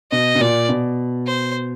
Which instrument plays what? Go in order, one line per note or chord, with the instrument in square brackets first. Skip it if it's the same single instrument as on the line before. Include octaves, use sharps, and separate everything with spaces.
[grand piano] B2 [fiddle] D#5
[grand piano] B2
[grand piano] A#2 [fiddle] D5
[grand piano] B2
[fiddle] C5